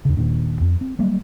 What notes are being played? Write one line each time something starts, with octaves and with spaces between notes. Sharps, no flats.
E2 C#3
D#1 D#2 A#2 D4
F2
C4
F#3 G3 A#3